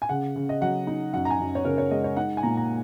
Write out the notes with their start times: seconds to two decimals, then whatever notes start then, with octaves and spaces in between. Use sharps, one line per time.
0.02 G#5
0.09 C#3 F#5
0.36 C#3
0.49 D#5
0.61 F#3 F#5
0.87 D#4
1.13 F#2 F#5
1.25 A#5
1.30 G#5
1.39 F#2
1.55 C#5
1.65 C#3 A#4
1.78 C#5
1.91 G#3 D#5
2.04 C#5
2.17 D#4 F#5
2.37 G#5
2.43 A#2 A#5
2.57 A#5